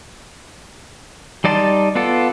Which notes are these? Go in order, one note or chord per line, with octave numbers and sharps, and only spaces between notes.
G3 D#4 D5 A5 C6
B3 F4 A4 D5